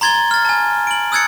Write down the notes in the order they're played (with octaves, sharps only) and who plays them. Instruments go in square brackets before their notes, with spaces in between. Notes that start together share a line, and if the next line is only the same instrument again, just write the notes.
[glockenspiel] A#5 C6 G#6 A6 G7
F6 A6
G#5 A5
D7 F#7
D#6 E6 F#6 G#6 A6 C#7